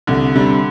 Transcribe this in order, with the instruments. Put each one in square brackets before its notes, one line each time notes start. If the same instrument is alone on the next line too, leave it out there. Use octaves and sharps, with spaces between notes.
[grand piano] C2 [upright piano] D3
[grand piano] C3 G3 D4